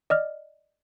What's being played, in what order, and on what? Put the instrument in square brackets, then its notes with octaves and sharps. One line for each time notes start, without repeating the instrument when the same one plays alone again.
[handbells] D5 D#5 F6